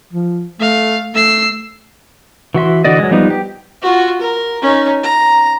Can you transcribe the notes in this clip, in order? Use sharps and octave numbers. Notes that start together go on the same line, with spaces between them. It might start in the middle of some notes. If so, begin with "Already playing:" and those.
F3
A3 F5
A3 E6 C7
E3 F#4 E5 C6
D3 E3 F#4 D5 D#5
F#3 G#3
F3 G3 B3 D#4
G4
F4 F#4
A#4
C#4 D#4
A#5